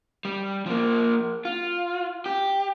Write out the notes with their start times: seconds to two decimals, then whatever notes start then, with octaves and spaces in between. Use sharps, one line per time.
0.25 G3
0.66 F3 A#3
1.45 F4
2.26 G4